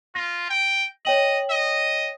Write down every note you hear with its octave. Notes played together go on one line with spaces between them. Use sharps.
F4 A#6
G5
C#5 D#5 G5 F#7
D#5